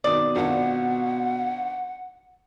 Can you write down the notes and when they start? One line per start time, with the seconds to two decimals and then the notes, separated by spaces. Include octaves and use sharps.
0.04 G#1 B2 D#3 D5 D#6
0.36 G#1 D4 F4 F#5